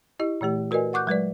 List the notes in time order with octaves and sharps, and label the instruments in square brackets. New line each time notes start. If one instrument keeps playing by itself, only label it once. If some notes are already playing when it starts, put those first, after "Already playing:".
[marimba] E4 G4 D#5
A#2 E3 A3 G4
F#4 A#4 B4 D5 D#5 G#5
F#5 C#6 D6 F#6 G6
F#3 G#3 B4 D5